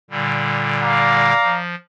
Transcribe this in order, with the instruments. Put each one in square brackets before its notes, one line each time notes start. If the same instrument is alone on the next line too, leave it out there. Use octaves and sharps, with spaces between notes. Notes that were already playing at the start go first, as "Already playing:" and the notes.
[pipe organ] A#2 D3 G3
[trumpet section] D5 F5 A#5
[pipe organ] F3